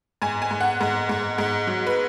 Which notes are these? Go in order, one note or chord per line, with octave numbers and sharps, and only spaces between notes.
G#2 G#5
G#5
G#2
F#5
G#2
G#2
G#2
F#3
B4